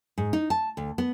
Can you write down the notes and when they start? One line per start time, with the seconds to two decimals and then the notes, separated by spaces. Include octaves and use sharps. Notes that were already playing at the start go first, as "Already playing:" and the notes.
0.18 G#2
0.33 D#4
0.50 A5
0.77 D2
0.98 B3